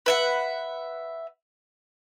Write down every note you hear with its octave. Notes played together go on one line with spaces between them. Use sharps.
B4 E5 F#5